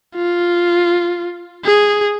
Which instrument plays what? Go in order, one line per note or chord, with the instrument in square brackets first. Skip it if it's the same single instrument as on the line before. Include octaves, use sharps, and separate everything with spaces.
[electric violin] F4
G#4